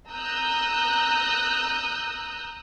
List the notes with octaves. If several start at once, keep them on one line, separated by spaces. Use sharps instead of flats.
A#5 D#6 E6 F#6 G6